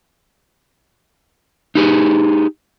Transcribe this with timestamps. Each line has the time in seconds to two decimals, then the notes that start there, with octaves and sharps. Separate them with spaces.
1.75 D#4 G4 G#4